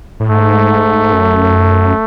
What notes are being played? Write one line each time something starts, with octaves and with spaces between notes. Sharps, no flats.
A2
G#2 A3
F#2